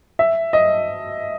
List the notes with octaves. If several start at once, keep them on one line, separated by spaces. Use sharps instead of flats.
E5
D#5